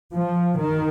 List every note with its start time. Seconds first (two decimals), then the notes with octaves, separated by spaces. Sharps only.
0.15 F3
0.60 D#3